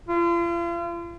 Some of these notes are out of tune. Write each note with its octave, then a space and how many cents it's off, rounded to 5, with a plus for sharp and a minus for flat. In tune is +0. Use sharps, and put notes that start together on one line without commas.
F4 -40